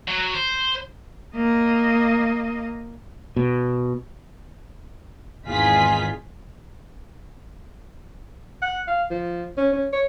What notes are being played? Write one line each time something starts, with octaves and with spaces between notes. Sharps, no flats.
F#3
C5
A#3 D#5
B2
G#1 E2 D#4 F4 G#4 B6
F#5
F5
F3
C#4
C#4
C#5